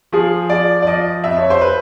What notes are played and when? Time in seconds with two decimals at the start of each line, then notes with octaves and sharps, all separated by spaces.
0.13 F3 G#4
0.49 F3 D5
0.82 D5
0.87 F3 D#5
1.24 F2 E5
1.38 C#5
1.50 C5
1.61 B4